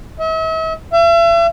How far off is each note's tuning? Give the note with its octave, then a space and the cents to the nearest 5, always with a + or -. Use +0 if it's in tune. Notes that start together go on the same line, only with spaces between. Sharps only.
E5 -45
E5 +40